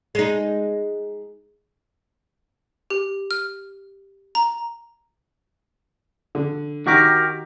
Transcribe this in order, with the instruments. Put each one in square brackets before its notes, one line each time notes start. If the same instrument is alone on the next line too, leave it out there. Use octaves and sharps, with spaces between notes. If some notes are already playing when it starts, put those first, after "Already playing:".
[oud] G#3 D#4
[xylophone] G4
F6
A#5
[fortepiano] D3
[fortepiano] D#3 C#6 D6 [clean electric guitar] F#4 G4 A#4